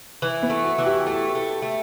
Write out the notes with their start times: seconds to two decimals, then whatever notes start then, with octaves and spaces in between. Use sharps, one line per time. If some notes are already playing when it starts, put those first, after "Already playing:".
0.22 E3
0.43 B3
0.50 A3
0.64 F#4
0.78 E3
0.86 G4
1.06 A3 A4
1.35 A3
1.62 A3